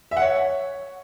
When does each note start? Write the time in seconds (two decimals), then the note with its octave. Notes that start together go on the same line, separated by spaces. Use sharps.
0.11 E5
0.17 F#5
0.22 C#5